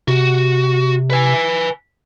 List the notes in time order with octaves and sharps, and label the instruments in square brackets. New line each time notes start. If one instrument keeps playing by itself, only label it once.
[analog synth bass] C3 [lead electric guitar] F#4
[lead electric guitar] B4 G#5